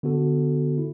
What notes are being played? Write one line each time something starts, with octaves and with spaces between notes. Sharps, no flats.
D3 B3 F#4 A4
E4